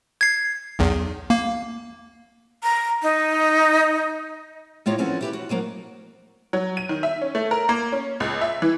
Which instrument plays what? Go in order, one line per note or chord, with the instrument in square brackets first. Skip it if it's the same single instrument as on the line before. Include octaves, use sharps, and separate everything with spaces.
[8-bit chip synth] G#6 C7
B1 E2
A#3
[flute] A#5
D#4
[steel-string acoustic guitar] A2 A#3 F4 C#5 D#5
E3 F3 C4 C#4 A4 F#5
E4 G4 B4
F#4
F3 F#3 A#3 D#4
[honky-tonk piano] F#3
D#7
D#3
E5
C#4
A3
A#4
A#3
C#4
C#2
E5
E3